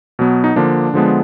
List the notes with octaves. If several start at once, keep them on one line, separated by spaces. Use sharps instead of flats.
B2 F#3 B3
D#4
D3 F3 A#3 D4
D3 F3 G#3 B3